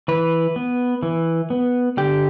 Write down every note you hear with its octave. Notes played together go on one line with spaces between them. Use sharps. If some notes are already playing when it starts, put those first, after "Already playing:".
E3 B4
B3
E3
B3
D3 G4